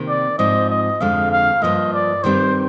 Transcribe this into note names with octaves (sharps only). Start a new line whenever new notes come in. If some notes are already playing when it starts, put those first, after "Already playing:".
Already playing: C3 D#3 A#3
D5
G#2 F3 C4 D#5
D#5
F2 D3 G#3 F5
F5
G2 F3 A#3 D#5
D5
G2 D#3 G3 C4 D#4 C5